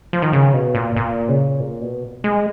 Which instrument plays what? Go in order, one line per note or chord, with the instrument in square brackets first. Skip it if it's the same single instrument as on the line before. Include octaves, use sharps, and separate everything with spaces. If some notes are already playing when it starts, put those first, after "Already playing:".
[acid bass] F3
D#3
C#3
B2
A#2
A#2
C#3
A#2
B2
G#3